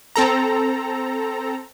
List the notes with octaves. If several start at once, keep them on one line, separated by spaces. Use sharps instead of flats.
C4 A4 A#5